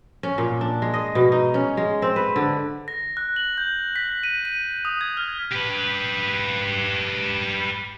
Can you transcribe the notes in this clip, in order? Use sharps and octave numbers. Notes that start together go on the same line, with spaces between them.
C#4
A#2
D4
G#3
D#5
B2
D#4
C#4
G#3
C4
B4
D3
A#6
F#6
F#7
G6
B6
D#7
D#7
D#6
G#6
F6
G4 B4